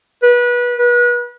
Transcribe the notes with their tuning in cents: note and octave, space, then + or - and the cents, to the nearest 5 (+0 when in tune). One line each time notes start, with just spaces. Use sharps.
B4 -25
B4 -35